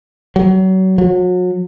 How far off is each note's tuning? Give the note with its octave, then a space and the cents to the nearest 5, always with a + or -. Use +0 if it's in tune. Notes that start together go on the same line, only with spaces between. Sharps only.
F#3 +30
F#3 -35